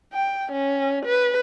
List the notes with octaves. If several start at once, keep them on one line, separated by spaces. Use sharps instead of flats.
G5
C#4
B4